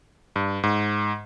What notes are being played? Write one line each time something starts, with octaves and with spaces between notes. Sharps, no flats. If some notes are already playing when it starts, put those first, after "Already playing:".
G2
G#2